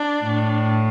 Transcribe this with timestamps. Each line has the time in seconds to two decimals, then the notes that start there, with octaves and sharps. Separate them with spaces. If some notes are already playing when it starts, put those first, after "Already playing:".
Already playing: D4
0.24 A2